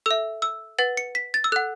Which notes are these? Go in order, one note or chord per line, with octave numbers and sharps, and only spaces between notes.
A4 E5 E6
E6
B4 F#5 A6
C#7
B6
A6
E6
A4 F#5 F#6